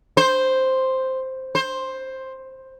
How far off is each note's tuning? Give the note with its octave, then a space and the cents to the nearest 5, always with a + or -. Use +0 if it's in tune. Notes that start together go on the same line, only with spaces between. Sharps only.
C5 +0
C5 +10